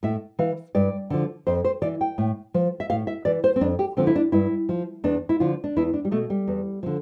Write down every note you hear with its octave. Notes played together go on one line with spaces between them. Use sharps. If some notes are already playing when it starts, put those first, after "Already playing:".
A2 E5
E3 F5
G2 D5
D3 F3
F2 C5
C5
E3 D5
G5
A2
F3
E5
A2 F5
E5
E3 D5
C5
C4
F2 D4
G4
D3 F3 C4
E4
D4
G2 E4
F3
E2 D4
E4
D3 F3 F4
D4
E2 E4
D4
G3
B2 A3
G3
E2
D3 F3